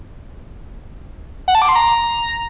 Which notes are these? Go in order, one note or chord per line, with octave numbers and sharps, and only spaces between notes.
F#5
A5
D6
C6
A#5